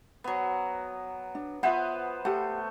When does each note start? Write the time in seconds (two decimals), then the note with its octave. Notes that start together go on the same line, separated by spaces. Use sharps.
0.24 F#3 B3
1.35 D4
1.63 B3 F4 B4 C5 E5 F#5
2.25 A3 G4 F#5